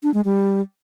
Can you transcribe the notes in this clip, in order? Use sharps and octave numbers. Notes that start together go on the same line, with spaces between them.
D4
G#3
G3